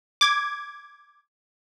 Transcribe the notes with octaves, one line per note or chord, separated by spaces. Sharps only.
D6 G#6